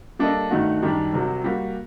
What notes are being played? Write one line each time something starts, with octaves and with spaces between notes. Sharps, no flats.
G3 A#3 D4 A4 D#5
G2 D#3 A3 D#4 F#4
F#2 D#3 G3 D4 G4
C2 C3 F#3
G3 A#3 F#4